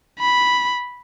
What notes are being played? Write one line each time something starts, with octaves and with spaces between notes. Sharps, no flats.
B5